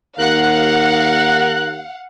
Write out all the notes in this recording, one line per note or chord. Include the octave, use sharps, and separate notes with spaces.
D#2 A#4 F5 F#5 F#6